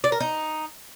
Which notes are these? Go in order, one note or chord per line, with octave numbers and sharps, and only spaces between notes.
D5
A#4
D#4